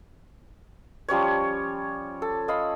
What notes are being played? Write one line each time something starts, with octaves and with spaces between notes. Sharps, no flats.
F3 G3 C#4 C#5
A4
D#5 F5 B5